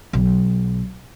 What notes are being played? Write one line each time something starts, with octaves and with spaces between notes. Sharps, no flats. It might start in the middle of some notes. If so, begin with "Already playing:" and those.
B1